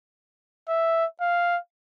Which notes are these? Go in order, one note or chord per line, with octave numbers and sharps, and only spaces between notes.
E5
F5